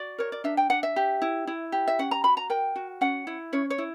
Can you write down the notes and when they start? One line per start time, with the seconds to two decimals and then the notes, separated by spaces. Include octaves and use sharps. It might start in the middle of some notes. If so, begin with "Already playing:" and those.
Already playing: F#4 D5
0.18 A#4 C#5
0.32 D5
0.44 D4 E5
0.57 G5
0.70 D4 F#5
0.83 E5
0.96 G4
1.22 E4
1.47 E4
1.72 G4
1.88 E5
1.99 C#4 F#5
2.11 A#5
2.24 F#4 B5
2.37 A#5
2.50 A#4 G5
2.76 F#4
3.01 C#4 F#5
3.27 E4
3.53 C#4 C#5
3.70 C#5
3.78 E4